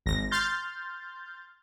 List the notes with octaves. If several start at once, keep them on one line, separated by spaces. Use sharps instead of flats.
G#1 A#6
C6 F6 G6 A6